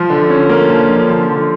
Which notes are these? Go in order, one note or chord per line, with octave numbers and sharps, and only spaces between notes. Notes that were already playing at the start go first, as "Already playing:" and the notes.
Already playing: F3
D3
C#4
A#3
F3
D3
F3
D3